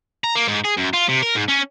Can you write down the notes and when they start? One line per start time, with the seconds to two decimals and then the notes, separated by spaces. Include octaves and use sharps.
0.24 A#5
0.36 A#3
0.48 G#2
0.65 G#4
0.77 F#2
0.94 F4
1.09 C3
1.23 A#4
1.36 G#2
1.49 C#4